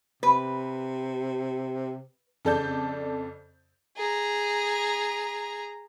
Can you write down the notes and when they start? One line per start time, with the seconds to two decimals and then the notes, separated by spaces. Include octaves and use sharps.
0.23 C3 B4
2.45 F2 C#3 A4 D5 A5 G6
3.97 G#4 A#5